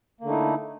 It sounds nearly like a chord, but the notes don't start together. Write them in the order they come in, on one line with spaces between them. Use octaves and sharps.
A#3 D3 A3 D#4 E4